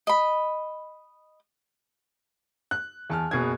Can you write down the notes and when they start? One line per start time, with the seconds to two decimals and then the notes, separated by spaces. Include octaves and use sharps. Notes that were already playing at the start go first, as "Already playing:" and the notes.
0.07 D#5 B5
2.71 F#6
3.10 E2 A5 F6
3.31 F#1 B2 G#4 G#6